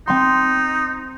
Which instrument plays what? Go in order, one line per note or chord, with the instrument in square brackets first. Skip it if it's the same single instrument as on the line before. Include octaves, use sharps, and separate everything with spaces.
[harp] C4 C6 [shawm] D#4